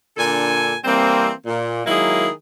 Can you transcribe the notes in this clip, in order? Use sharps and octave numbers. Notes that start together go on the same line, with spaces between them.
A#2 D3 D4 A4 G#5
E3 G3 A#3 C4
A#2
D#3 F#3 G#3 A#3 E4 G#4